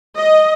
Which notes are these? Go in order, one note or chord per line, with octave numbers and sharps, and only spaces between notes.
D#5